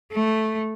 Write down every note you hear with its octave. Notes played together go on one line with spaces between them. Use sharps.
A3